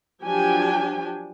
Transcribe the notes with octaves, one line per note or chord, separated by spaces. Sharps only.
F3 F#3 D4 G4 G5 G#5